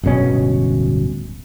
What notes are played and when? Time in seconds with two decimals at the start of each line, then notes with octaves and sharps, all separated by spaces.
0.03 D1 G1 B2 C#4